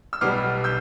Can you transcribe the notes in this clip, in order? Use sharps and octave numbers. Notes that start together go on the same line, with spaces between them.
E6
B1 B2 G3 D6 F6
E6 G6